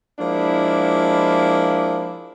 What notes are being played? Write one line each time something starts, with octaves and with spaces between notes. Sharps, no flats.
F3 G#3 A#3 D4 E4